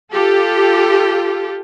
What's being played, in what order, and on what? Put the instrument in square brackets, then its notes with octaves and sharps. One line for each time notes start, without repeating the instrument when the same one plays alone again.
[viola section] F4 G4 A4